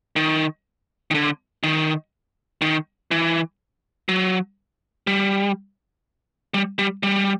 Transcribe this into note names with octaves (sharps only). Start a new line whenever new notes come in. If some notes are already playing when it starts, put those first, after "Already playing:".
D#3
D#3
D3
D#3
D#3
E3
F#3
G3
G3
G3
G3